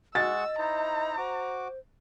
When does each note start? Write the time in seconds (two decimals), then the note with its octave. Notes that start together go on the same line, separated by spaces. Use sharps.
0.15 G#3 D#5 F#5 C#6 E6 A6
0.59 D#4 E4 C5 A#5
1.17 F#4 C5 D6